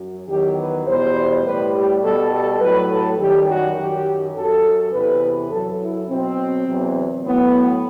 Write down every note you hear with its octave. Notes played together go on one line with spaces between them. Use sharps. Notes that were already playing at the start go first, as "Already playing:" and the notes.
Already playing: F#2 F#3
E2 D#3 F#3 G4
B4
E2 B2 G3 C5
A2 G3 B4
G4
B2 G3 A4
A4
A2 F#3 B4
A4
F#2 D#3 G3 G4
F#4
F#2 D#3 F#3 G4
F#2 F#3 A4
E2 C3 E3 B4
F#2 F#3 A4
E4
B2 F#3 C4
E2 C3 F#3
A2 F#3 B3